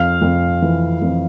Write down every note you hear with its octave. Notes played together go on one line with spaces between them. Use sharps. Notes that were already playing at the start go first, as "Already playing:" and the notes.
Already playing: F2 F5 F6
F2
E3
F2